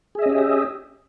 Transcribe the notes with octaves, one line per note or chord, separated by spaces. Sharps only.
C#4 G4 G#4 D#5 E5